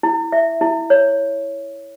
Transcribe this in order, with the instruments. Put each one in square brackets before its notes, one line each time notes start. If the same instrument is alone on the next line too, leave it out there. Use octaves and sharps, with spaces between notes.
[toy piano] E4
E5
E4
C#5